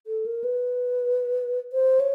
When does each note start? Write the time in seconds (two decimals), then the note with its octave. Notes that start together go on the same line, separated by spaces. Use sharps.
0.07 A4
0.26 A#4
0.44 B4
1.73 C5
2.00 C#5